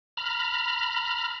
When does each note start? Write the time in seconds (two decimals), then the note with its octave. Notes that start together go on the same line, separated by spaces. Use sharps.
0.17 A#5 B5 F6